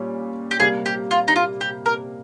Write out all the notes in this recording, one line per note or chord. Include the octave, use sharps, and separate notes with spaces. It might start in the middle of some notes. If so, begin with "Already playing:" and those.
Already playing: A#2 G3 C#4
G4
C3 G3 A#3 G#4
G4
F4
D#4
F4
G4
A#4